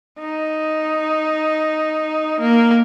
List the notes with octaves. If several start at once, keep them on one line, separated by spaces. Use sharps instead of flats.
D#4
A#3